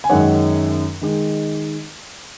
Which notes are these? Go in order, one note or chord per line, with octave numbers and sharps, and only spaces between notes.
G#5
F#2 D#3 G#3 D#4 C#5 F#5
D#3 G#3 D#4